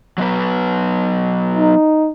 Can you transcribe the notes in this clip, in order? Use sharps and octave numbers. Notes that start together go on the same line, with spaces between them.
F#3 B3 B4
D#4